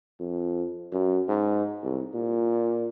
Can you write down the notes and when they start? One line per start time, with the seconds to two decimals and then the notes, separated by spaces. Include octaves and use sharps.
0.20 F2
0.93 F#2
1.28 G#2
1.83 C2
2.14 A#2